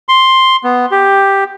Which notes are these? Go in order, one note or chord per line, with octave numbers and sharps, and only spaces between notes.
C6
B3
G4